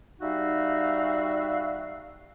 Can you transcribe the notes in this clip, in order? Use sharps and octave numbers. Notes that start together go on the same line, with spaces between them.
G3 D#4 F#4 E5 F5